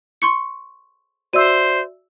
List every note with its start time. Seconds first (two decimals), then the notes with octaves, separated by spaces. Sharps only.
0.22 C6 C#6 C#7
1.33 F#4 C5 D5 E5 E6 D#7